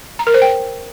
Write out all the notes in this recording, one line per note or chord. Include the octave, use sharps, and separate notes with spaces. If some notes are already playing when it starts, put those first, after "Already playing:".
A#5
A#4
C5
G5